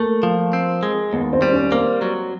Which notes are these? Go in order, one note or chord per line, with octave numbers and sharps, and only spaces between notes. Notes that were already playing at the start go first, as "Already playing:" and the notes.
Already playing: A3 A#3
F3
C4
G#3
D#2 B3
C4
G3
C#4
A#3 C4
F#3